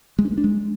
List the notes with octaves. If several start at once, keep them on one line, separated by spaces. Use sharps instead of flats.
G#3
D4
A#3
D4
G#3